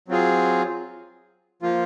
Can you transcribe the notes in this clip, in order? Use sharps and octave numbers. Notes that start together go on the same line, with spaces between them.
F#3 C4 F4 G#4
F3 A#3 F4